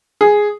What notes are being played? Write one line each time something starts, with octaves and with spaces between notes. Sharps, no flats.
G#4